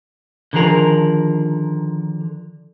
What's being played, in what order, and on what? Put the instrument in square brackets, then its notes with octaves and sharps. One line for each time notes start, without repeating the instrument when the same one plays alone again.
[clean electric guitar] D3 D#3 F3 G#4 A#4